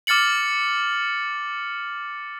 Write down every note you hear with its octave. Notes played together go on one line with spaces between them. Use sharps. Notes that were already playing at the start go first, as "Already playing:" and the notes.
D6 F6 A6 C#7 F#7